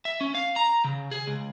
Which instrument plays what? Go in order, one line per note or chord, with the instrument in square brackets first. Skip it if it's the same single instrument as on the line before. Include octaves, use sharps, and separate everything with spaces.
[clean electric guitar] E5
C#4
F5
A#5
C#3
G#4
C#2